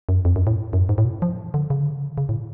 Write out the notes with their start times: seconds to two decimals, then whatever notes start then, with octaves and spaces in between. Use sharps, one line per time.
0.09 F#2
0.25 F2
0.36 F#2
0.47 A2
0.73 F#2
0.89 G#2
0.98 A2
1.05 B2
1.22 F3
1.54 D3
1.70 C#3
1.81 D3
1.92 C#3
2.18 C#3
2.29 A2